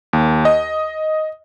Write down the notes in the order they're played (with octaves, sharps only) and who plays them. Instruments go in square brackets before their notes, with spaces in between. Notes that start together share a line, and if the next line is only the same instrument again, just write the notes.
[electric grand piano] D#2
D#5